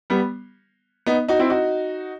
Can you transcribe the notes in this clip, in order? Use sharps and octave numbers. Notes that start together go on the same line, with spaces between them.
G3 B3
B3 D#4
D#4 F#4
C4 E4
D#4 F#4